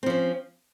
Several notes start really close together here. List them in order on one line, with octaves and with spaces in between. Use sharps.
C4 F3 C#4